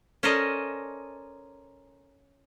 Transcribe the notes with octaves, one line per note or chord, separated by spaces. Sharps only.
C#4 A4 A#4 C5 D5 D#5